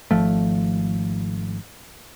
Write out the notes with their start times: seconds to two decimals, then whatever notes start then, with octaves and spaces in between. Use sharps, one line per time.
0.11 G#1 F3 A3